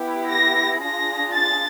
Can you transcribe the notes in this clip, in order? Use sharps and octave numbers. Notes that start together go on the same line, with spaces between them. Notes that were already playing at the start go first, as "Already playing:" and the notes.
Already playing: B3 E4 G4
A#6
D4 F4 G#4 A#6
A6